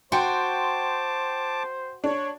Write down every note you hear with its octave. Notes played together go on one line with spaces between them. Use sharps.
F#4 C5 G5 A5 C6 D6
D4 C#5